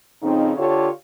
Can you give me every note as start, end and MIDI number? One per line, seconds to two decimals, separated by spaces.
0.23 0.52 41
0.23 0.52 49
0.23 0.52 60
0.23 0.52 63
0.57 0.88 50
0.57 0.88 65
0.57 0.88 67
0.57 0.88 69
0.57 0.88 73